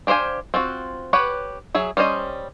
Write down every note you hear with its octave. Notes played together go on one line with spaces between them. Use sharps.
D4 G4 C5 F5 G#5
C4 F4 F#4
G4 B4 C#5 F#5
F#3 G#4 E5
G3 C#4 C5 D#5